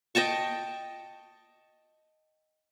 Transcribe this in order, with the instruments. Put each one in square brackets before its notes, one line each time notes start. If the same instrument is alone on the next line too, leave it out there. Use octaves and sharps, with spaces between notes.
[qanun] D#5 G5 A5 C#6